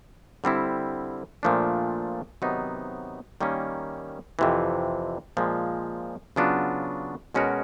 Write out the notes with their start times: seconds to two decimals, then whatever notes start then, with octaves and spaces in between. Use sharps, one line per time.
0.44 D3 G3 C4 E4
1.43 A#2 F3 A3 D4
2.42 C3 D#3 F#3 B3 D#4
3.41 D#3 G3 A#3 C#4
4.39 F2 C3 E3
5.37 A#2 F3 G#3
6.36 C#3 F#3 B3 D4 F4
7.34 B2 G#3 C#4 F#4 A#4